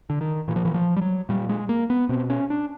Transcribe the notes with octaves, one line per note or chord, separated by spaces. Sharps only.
D3
D#3
A#2 E3
F3
E3
F3
G3
F#3
A#2 G3
G#3
A#3
B3
B2 C4
C#4
D4